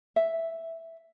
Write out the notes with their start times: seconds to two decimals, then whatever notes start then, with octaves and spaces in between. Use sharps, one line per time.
0.16 E5